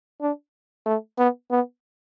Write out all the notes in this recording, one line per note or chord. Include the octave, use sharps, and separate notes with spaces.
D4
A3
B3
B3